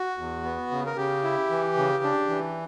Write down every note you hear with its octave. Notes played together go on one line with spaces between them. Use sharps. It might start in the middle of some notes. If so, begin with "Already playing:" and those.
Already playing: F#4
E2
B3
C#3
A#4
C#3 G4
E4
E3
C#3
D4
E3